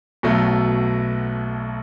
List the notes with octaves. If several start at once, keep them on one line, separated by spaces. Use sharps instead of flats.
B1 B2 F#3 A3